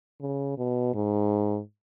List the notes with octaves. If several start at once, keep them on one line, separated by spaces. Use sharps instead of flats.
C#3
B2
G#2